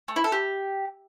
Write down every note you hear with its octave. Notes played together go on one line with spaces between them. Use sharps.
A3
E4
A4
G4